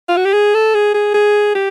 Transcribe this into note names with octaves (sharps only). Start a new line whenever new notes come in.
F4
F#4
G4
G#4
A4
G#4
G#4
G#4
G4